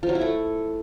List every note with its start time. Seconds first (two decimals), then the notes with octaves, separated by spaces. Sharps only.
0.03 F3
0.09 F#3
0.15 E4
0.21 A3